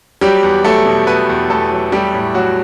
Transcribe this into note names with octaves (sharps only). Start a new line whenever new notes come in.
F#3 G3 G4
E2
F#3 A3 A4
B2
B2 B3 B4
E2
E2 A3 A4
F#3
G3 A3 G4
A2
A2 F#3 F#4